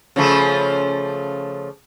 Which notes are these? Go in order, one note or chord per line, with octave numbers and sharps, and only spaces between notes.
C#3 F3 A3